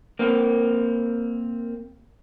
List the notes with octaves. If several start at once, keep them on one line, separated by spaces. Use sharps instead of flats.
A#3 C4